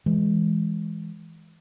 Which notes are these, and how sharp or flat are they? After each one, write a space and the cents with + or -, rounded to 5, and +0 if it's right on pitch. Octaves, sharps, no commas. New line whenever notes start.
E3 +0 G#3 +0